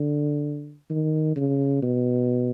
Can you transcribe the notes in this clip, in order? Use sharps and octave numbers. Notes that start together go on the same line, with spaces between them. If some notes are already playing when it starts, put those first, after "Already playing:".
Already playing: D3
D#3
C#3
B2